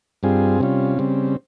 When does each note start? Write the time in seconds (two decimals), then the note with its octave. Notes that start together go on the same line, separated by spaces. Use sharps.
0.23 G2 G3 C4 F4 G#4
0.60 C3 G3 C#4 F4
0.99 C#3 G3 C4